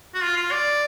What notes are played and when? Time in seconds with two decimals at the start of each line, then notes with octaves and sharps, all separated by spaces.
0.14 F#4
0.23 F4
0.37 F4
0.51 D5